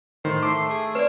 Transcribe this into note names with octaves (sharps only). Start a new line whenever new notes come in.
A2 D#3 C5
A3 C6 D6
G#4
C4 B4 C#5 D5